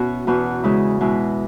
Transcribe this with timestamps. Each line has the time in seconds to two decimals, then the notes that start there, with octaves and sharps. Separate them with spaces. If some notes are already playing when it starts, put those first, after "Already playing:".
Already playing: B2 B3 C#4 E4 F#4
0.27 E2 B2 B3 F#4
0.64 C#3 G#3 E4
1.01 B2 G#3 E4